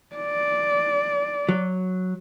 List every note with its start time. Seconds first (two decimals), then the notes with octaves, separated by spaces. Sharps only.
0.16 D5
1.49 F#3